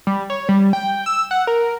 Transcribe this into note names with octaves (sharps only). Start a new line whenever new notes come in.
G3
C#5
G3
G5
E6
F#5
A#4